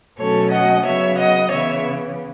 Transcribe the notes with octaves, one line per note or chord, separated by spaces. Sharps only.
B2 F#3 A3 C#4 A4 C#5
D#5 F#5
C#3 F#3 B3 C#5 E5
D#5 F#5
C#3 E3 B3 C#5 E5